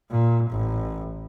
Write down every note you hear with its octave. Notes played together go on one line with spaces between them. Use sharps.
A#2
A1